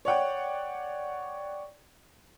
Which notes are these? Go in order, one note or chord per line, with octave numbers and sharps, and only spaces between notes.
C#5 D5 F#5 G5